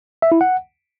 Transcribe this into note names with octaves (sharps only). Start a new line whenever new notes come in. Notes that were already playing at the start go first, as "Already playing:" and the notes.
E5
E4
F#5